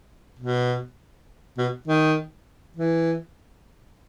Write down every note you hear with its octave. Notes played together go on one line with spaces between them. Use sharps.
B2
B2
D#3
E3